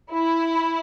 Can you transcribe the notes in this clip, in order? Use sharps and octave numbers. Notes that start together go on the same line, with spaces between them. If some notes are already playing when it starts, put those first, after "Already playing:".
E4